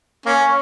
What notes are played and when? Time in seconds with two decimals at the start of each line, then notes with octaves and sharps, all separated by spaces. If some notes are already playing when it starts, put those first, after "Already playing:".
0.26 A#3 C#4